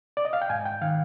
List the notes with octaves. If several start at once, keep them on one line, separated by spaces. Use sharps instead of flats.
D5
D#5
F5
G5
G#2 G#5
G5
D#3 F5